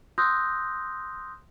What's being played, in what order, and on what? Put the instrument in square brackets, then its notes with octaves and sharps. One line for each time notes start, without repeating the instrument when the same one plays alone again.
[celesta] C6 D#6 E6 F#6 G6 A#6